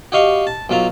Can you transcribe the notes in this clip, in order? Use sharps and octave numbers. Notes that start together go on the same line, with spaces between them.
F#4 G4 D#5 F5 C#6
A5
B1 F#3 F4 A#5